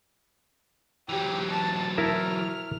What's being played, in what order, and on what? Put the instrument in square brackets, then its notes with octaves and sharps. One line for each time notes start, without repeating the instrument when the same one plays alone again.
[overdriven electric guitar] E3 F#3 [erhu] G4
[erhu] A5
[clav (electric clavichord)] E4 A#4 A5 [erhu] F6